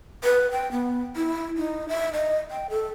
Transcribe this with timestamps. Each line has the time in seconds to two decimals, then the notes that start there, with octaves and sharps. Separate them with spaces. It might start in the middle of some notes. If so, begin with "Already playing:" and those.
0.24 B4
0.51 G5
0.72 B3
1.16 E4
1.57 D#4
1.89 E5
2.13 D#5
2.51 G5
2.70 A4